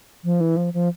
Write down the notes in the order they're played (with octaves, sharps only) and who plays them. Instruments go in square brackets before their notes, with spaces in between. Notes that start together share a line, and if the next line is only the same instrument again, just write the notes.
[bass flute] F3
E3
F3
F3